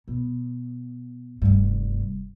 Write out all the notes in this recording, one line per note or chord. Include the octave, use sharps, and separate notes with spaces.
B2
F1 G2